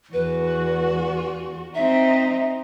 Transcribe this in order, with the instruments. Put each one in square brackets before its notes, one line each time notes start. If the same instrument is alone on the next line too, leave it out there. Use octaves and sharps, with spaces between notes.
[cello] E2 F#4 [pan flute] B4
[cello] C4 D#4 [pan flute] E5